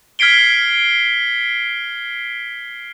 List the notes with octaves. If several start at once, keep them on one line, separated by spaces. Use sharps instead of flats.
F6 G#6 B6 C7 D7 G7